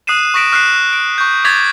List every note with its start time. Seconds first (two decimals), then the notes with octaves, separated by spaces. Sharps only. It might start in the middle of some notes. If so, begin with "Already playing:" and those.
0.07 D#6 F#6 C7 D#7 E7
0.34 C#6 D#6 A#6 B6 D7 E7
0.52 C#6 F6 F#6 B6 C7 E7
0.93 D7
1.18 C#6 G6
1.44 C#6 D6 G#6 A6 B6 F#7